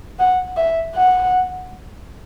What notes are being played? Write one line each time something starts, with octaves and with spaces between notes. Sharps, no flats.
F#5
E5
F#5